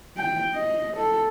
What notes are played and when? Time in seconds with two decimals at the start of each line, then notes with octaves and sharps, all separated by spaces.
0.18 G5
0.55 D#5
0.97 A4